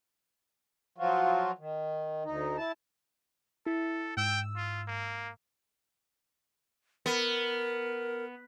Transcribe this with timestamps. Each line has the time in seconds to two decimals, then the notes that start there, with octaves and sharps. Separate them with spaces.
0.98 F3 F#3 F4 F#4
1.58 D#3
2.24 D2 D#4
2.57 E4 A5
3.66 E4 A4
4.17 G#2 G5 E6
4.56 F4
4.88 A#3
7.06 B3 A#4